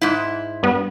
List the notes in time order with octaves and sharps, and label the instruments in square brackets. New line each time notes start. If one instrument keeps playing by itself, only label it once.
[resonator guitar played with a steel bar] G#2 E4
[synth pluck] G2 B3